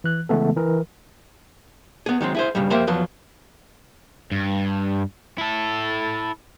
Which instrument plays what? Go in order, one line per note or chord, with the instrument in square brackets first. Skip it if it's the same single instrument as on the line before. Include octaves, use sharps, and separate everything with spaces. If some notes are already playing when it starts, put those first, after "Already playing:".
[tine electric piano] E3 F#6
C#3 E3 G#3 A3 B3 A4
E3 A#4
[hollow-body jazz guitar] B3 G#4
D#3 F#3 G#3 C4
E4 G#4 C5
B1 G2 C#3 G3
F2 A#3 G4 C5 E5 B5
E2 F3 F#3 B4
[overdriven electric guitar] G2
E4 A4